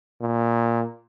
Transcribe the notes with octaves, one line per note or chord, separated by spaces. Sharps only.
A#2